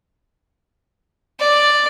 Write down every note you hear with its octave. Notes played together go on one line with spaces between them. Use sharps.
D5